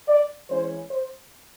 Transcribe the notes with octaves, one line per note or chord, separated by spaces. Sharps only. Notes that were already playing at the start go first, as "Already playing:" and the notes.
D5
E3 G#3 C#4 C5
C5